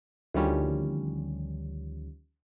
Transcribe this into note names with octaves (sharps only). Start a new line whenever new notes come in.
D2 D#3 F3 G3 C#4